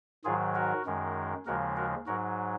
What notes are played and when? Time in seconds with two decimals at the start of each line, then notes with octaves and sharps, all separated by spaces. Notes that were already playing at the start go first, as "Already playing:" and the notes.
0.25 G#2 D#3 F#3 F4 G#4
0.55 F#4 A#4
0.86 F#2 D#3 G#3
1.46 D#2 C#3 F3 G#3 F#4 A#4
1.77 F#4 A#4
2.07 G#2 F#3 F#4 A#4